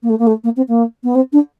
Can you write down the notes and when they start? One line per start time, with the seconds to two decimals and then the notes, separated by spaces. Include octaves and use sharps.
0.02 A#3
0.09 A3
0.19 A#3
0.26 A3
0.43 A#3
0.56 C4
0.68 A#3
1.03 B3
1.15 C4
1.32 D4